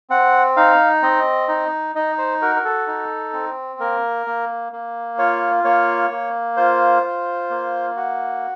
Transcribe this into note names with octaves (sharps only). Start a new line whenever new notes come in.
C4 F#5
D#4 F5
C4 D#5
D#4
D#4 D#5
C5
F#4 A#4
A#4
A4
D#4
C4
A#3 A#4
A#3
A#3
F4 C#5
A#3 C#5
A#3
F4 C5
F4
A#3
F#4